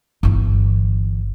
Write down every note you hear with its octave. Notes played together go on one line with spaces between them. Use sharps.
G1 E3